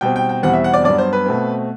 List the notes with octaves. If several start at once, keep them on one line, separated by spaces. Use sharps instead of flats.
B2 G3 C4 G5
G5
G5
E2 B2 G3 C4 F#5
E5
F#5
D5
G2 F#3 B3 D5
C5
B4
B2 A3 C4